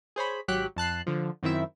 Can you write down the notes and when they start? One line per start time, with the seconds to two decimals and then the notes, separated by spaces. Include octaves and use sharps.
0.16 G#4 C5 C#5 B5
0.48 G#1 F#3 G4 F#6 B6
0.76 F2 A5 F#6 C7
1.06 D3 F3
1.43 F#2 D#3 C4 E4 E5